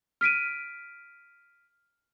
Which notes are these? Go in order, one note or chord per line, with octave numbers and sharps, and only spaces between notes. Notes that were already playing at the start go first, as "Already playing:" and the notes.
F6 B6 D7 D#7